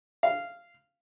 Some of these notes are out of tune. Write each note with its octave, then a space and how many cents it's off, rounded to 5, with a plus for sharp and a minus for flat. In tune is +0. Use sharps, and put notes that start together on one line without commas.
F5 -10